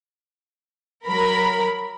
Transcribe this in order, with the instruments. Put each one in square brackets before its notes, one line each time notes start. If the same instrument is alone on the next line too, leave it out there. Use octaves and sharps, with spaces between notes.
[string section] F#3 A#4 B5